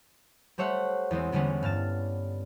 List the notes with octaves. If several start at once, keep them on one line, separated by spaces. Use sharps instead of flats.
G3 A3 C5 C#5 E5 F#5
E2 G#3 C4
E2 D3 G3 G#3 B3 C#4
G2 F6 A6 E7